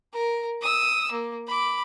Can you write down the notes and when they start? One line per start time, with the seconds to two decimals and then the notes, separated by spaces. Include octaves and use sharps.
0.13 A#4
0.62 D#6 E6
1.12 A#3
1.47 B5 D6